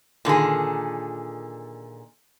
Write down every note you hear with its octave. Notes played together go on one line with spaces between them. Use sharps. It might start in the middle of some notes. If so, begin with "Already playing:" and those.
A#2 D3 D#3 G#4